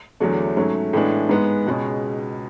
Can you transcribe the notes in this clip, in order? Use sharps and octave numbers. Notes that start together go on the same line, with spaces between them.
E2 D3 F#3 A3 D4
G#2 F#3 A3 C#4
A2 E3 G#3 B3 D4
G#2 G#3 B3
C#2 B2 G#3 C#4